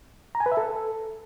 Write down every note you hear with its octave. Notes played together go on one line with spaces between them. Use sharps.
A#5
G#5
B4
E5
A4